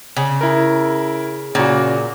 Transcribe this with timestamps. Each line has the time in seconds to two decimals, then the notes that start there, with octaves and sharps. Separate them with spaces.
0.17 C#3
0.41 E4 A#4
1.55 A#2 C#3 F#4